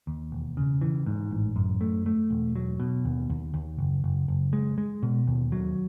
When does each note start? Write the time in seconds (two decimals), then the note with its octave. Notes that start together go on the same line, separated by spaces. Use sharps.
0.07 D#2
0.32 E1
0.57 C#3
0.81 E3
1.06 G#2
1.31 A1
1.56 F#2
1.81 A3
2.06 A3
2.30 E1
2.56 F#3
2.80 B2
3.05 D#2
3.30 D#2
3.54 D#2
3.79 F#1
4.04 F#1
4.28 F#1
4.53 G#3
4.78 G#3
5.03 B2
5.27 D#2
5.52 F#3